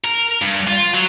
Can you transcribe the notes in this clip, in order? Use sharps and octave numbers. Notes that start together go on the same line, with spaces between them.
A#4
G2
F4
F#3